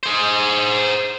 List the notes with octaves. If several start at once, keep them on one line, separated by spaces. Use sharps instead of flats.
G#4 C5